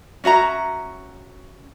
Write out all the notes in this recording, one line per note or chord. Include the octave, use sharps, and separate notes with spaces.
C#4 F#4 E5 A#5